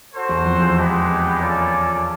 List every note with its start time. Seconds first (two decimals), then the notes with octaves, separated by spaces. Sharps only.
0.14 F#4 A4 C5
0.29 E2
0.45 F2
0.60 E2
0.76 F2 G#3 B3 D#4 G4 B4
1.39 A#3 C#4 F4 A4 D5